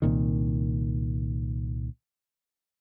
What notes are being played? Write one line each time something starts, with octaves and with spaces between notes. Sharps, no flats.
C2 A#2 D#3